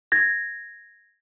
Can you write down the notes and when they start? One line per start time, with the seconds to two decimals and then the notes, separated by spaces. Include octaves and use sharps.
0.12 G#6 A#6